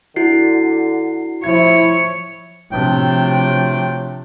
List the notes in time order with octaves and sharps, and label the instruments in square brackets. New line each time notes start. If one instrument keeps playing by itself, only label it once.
[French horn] D3 [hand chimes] E4 F#4 C7
[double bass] F3 [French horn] E4 [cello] C#5 [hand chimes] G#6
[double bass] C3 F3 [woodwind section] F#3 A3 D4 [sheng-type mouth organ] G5